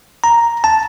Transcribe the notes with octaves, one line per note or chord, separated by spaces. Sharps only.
A#5
A5